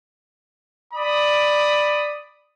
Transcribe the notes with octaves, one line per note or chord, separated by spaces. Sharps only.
D5 B5 D#6